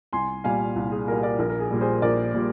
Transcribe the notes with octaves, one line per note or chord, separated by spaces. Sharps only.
C2 G#5 C6
A#2 G3 F5 G#5
C2
G#4
A#2 G3 A#4
A#4 D5
A#1 A#4
A#4
G#4
A#2 G3
G#4 C5
A#1 A#4 D5
A#2 G3